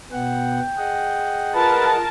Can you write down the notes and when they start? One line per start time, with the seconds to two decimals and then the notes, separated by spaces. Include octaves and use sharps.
0.12 B2 B3 F#5 G5
0.78 G#4 D#5 F#5
1.55 F4 A#4 B4 A5